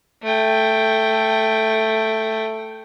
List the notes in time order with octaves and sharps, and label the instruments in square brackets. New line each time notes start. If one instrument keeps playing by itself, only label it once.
[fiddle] A3 G5